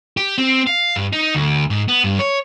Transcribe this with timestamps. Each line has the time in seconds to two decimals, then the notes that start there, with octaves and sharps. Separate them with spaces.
0.17 G4
0.38 C4
0.67 F5
0.96 G2
1.13 D#4
1.35 D2
1.70 G#2
1.88 B3
2.04 G2
2.19 C#5